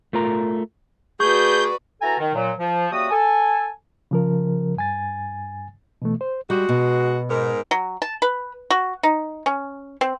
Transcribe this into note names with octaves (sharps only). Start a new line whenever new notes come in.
A3 F4 A#4 A#5
A3 F#4 G#4 B4 D5 C#6 G6
B3 E4 F#4 A4 G#5 A#5
D#3
A#2 F#3
F3
C#3 G3 A#3 F#4 E5 D#6
A4 G#5
C#3 F3 A#4
G2 G#5 A6
B2 E3 A3
C5
G3 G#3 F#4
B2
G#2 A#4
F#3
A5
B4
F#4
D#4
C#4
C4